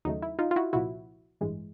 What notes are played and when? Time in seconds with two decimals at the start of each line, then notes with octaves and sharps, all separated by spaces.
0.05 D#2 C#3 F#3 A3 D#4
0.22 E4
0.39 D#4 F4
0.51 F4
0.56 E4 F#4
0.73 C2 A#2 F3 E4 F#4
1.41 A1 G2 E3 G#3